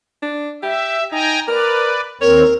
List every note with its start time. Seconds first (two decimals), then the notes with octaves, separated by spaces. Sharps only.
0.22 D4
0.63 G4 E5
1.12 D#4 G5 G#5 A#5
1.48 A#4 B4 D5
2.21 D#2 C4 A#4 C#5